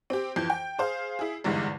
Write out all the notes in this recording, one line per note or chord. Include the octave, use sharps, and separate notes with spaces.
C4 G4
F2 E3 G6
G5
G#4 C5 F5
E4 G#4
G#1 E2 G2 D3 G#3